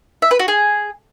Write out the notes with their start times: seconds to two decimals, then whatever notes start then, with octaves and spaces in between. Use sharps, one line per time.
0.22 E5
0.31 B4
0.39 F#4
0.48 G#4